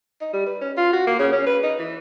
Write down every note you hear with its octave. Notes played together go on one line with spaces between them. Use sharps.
D#4
G3
B4
C#4
F4
F#4
A#3
C#3
C#4
B4
D#4
E3